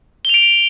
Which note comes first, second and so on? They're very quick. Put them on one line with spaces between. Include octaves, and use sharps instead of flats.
G7 F7 D7